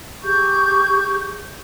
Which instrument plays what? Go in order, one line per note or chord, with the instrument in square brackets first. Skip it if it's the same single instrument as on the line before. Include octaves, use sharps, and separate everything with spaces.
[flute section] G4 G#4 C#6 G6